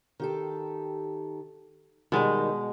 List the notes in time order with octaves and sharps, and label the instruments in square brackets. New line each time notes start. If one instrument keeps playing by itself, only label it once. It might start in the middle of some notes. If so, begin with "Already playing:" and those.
[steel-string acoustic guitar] D#3 G4 A4
[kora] B2 G#3 [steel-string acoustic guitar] D#3 G3